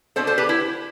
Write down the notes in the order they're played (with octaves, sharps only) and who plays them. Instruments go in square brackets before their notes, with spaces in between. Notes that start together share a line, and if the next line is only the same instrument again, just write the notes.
[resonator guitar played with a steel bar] B2 B3 D4 A4 C5
A4 C5
G4 B4
E4